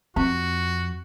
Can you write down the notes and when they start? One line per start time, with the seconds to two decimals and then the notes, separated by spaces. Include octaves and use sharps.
0.16 F2 C4 F#4